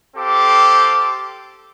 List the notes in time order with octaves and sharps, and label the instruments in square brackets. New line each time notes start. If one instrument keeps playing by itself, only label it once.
[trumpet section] C4 G4 A4 C5 F5 D6